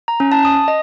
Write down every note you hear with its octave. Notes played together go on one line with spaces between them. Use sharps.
A#5
C#4
A5
D#6
D#5